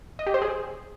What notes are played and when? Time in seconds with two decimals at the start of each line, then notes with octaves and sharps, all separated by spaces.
0.19 D#5
0.27 G4
0.34 C5
0.42 G#4